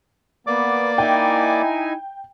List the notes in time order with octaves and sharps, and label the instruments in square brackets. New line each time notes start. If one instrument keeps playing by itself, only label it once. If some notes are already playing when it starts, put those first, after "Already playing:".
[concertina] A#3 D5 D6 [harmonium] B3
[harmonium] D#4 E4 G#5 [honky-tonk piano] G5